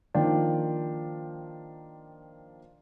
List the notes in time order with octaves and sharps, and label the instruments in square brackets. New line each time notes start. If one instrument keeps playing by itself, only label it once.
[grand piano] D#3 F3 A#3 D4 G5